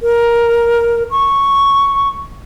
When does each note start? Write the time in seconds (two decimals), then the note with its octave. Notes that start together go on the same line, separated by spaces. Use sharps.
0.03 A#4
1.11 C#6